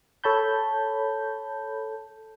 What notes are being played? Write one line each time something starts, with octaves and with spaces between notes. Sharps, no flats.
A4 C#5 A5 B5 G6